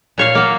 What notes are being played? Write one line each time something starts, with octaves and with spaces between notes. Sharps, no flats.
A#2 C#5 F5
F#3 A#3